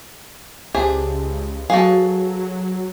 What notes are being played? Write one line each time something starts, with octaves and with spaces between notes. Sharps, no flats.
C#2 D4 G4 G#4 C5 E5
F#3 F#4 G#4 A4 B4 F5